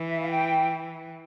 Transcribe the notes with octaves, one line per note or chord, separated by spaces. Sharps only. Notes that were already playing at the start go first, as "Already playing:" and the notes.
Already playing: E3
E5
F5
G5